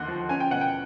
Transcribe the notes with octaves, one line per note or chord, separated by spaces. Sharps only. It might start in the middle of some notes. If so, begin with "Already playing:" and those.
Already playing: D#2 D3 F#5 C6
F3
C#4 G#5
G5
B2 F#5
G5